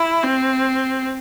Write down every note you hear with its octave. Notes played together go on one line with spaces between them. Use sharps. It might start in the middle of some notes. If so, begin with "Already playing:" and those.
Already playing: E4
C4